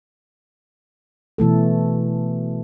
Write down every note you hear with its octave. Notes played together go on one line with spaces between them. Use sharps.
B2 E3 A3 A4